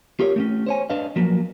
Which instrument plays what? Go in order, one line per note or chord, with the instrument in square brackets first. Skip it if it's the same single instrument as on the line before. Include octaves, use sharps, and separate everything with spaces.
[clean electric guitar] F4 G4 A#4 C#5
A3 C4 C#4
C5 C#5 G#5
D4 B4 D#5 F5
F3 F#3 A#3